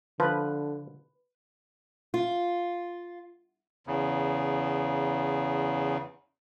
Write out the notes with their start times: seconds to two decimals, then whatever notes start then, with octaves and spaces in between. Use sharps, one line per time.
0.20 D3 F3 B4
2.14 F4
3.87 E2 C#3